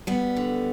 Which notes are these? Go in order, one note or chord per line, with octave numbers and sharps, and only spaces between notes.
G3 B3
D3